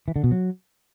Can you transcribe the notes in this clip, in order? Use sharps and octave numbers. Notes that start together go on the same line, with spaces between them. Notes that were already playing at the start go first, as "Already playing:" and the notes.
E3
D3
B2
F#3